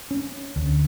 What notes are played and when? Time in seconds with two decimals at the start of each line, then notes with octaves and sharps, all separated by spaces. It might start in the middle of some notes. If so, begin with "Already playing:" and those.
0.11 C#4
0.56 D2